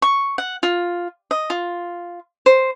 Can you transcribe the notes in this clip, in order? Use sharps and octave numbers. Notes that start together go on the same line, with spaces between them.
C#6
F#5
F4
D#5
F4
C5